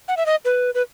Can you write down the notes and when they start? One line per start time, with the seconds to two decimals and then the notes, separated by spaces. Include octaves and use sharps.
0.08 F#5
0.17 E5
0.26 D#5
0.45 B4
0.75 B4